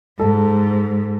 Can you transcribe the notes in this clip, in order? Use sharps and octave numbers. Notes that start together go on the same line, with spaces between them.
G#2 A4